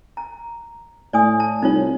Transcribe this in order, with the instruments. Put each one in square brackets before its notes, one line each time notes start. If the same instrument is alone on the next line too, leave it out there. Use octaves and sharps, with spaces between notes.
[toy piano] A#5
[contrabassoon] A2 [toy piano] D5 G#5 D#6
[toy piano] A5
[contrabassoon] C2 [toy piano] D#4 F4 C#5